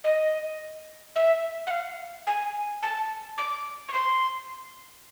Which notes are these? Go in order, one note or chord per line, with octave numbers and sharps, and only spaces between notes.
D#5
E5
F#5
F5
G#5
A5
D6
C#6
C6